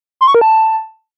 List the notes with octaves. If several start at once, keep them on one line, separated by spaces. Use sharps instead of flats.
C6
C#6
A#4
A5